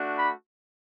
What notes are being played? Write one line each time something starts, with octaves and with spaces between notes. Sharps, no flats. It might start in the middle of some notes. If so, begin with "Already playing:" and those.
Already playing: A3 D4 F#4
B5